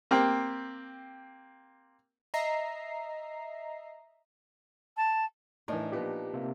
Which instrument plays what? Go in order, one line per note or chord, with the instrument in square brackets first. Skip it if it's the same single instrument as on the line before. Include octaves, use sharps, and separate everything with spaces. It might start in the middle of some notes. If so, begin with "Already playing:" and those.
[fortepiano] A#3 C4 G4
[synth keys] D#5 E5 A#5 A#6 C7
[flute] A5
[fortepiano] A2 E3 [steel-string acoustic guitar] D4 D#4 A#4
[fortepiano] A#2 F3 B3 [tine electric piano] G4
[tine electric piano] C3 A#3